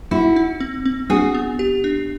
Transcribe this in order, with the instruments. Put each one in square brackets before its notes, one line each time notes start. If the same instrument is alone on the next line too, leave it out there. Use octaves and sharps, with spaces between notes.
[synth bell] D#4 [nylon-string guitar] E4 F#4
[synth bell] D#4
C4
C4
[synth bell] D4 [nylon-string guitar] F#4 G#4
[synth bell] B3
G4
D4